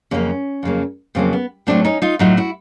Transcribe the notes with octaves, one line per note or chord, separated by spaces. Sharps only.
F2 C#3 F#3 A#3 B3 C#4
F2 C#3 F#3 A#3
F2 C#3 F#3 A#3 C4
B3
A2 F#3 A3 C4 D4
C#4 D#4
D#4 F4
A2 F#3 A3 D#4 F4
E4 F#4